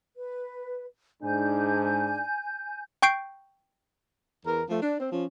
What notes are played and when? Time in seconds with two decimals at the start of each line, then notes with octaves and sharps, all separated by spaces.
0.16 B4
1.23 G#2 D4 G#5 G6
3.02 G5 C#6 G6 C7 D7
4.46 E2 A#4
4.70 F3 A3
4.82 D4
5.00 C4
5.12 F3 C#4